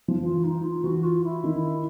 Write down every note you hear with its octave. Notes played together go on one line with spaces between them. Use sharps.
F3
E3 F4
D#4
F4
E3 F#4
F4
E4
D#3